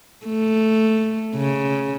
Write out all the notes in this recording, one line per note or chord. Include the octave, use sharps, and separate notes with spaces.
A3
C#3